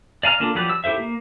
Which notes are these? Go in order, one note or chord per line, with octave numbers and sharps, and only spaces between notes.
D5 F5 G#5 A#5 F6
A#3 D4 F4 A4 A#4
F3 F#3 G4 B4 D5
E6
E4 G4 A4 C5 E5
A#3